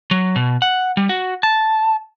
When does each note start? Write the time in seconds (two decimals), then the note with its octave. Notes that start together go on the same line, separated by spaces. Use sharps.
0.11 F#3
0.36 B2
0.62 F#5
0.97 G3
1.09 F#4
1.43 A5